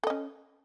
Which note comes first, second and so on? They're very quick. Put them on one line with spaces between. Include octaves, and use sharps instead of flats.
A4 D#5 C#4